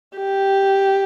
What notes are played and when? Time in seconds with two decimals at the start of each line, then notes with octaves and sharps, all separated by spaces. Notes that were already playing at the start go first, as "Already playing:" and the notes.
0.16 G4